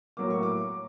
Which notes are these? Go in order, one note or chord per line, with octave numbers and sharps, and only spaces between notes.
A2 F#3 A#3 D6
C#6
D6